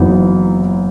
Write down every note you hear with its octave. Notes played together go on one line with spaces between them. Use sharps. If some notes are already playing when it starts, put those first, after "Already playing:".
Already playing: F#1 F#2 E3 B3 D#4